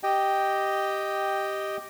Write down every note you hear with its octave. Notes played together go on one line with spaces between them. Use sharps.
G4 D#5 G5